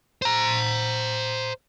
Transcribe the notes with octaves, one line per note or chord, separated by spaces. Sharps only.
C5 A#5